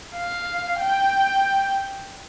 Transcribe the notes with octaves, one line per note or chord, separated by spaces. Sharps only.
F5
G5